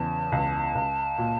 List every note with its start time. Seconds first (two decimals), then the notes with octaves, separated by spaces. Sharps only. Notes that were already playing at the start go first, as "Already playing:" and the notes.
Already playing: E2 C#3 A5
0.32 C#2
0.75 C#2
1.18 A#2